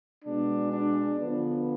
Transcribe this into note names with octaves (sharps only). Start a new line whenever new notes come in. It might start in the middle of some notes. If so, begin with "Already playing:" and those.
B2 G#3 B3 D4
D4
D3 F3 B3